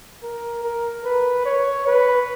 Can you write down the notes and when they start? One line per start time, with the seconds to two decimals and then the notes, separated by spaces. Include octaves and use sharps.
0.23 A#4
0.64 A#4
1.05 B4
1.46 C#5
1.87 B4